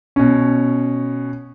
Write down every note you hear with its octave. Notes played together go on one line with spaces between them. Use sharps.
B2 C#4